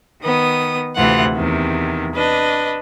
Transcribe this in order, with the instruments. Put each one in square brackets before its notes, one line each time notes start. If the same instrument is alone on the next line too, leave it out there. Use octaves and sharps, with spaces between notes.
[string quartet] D#3 B3 D#6
D2 C3 E3 F4 F#5
E2 C3 D#3
D4 B4 D#5